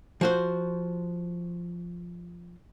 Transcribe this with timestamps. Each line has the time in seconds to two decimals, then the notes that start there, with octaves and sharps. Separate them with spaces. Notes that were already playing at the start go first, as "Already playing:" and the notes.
0.21 F3 F#4 C5